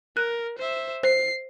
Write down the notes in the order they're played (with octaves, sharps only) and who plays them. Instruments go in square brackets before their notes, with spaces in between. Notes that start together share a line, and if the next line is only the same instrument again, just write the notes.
[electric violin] A#4 [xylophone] F#6
[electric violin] C5 E5
[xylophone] C5 [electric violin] C7